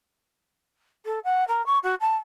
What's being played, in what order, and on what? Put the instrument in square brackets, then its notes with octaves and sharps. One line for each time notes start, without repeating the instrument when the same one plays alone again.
[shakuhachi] A4
F#5
A#4
C#6
F#4
A5